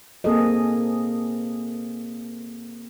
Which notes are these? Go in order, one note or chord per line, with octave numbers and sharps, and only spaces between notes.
A#3 C4 G#4 A4 D#5